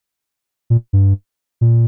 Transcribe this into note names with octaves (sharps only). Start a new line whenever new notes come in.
A#2
G2
A#2